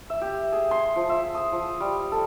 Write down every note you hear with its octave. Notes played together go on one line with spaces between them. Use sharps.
E5
G4
G#4
C6
F3
E5
D#6
F3
G3
A4